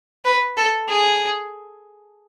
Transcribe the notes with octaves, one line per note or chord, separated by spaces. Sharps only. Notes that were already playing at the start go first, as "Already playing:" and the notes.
B4
A4
G#4